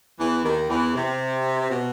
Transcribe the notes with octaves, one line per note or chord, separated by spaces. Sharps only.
E2 E3
D#2 D#3
E2 E3
C3
B2